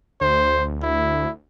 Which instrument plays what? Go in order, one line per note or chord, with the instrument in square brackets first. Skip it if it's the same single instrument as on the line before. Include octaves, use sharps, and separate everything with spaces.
[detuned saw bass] D2 [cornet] C5
[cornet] E4